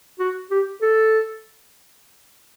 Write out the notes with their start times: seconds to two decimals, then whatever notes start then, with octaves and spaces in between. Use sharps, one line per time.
0.19 F#4
0.51 G4
0.82 A4